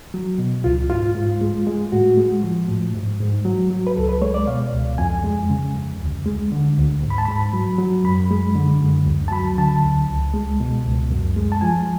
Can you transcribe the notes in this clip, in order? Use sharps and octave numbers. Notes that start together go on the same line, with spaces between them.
F#3
B2
C#2 F4
G#2 F4
G#2
G#3
G#3
A2 F#4
G#3
F3
A2
G#2
G#2
F#3
F#3
B4
C#2 A4
B4
G#3 C#5
D5
B2 F5
C#2
F2 G#5
G#3
C#3
F2
D2
G#3
D3
D2
G#2
B5
A5
G#2 B5
F#3
F#3
F#2 B5
G#3
D3
F#2
D2
A5
F#3 B5
D3 A5
D2
C#2
G#3
B2
C#2
F#2
G#3
A5
F3 G#5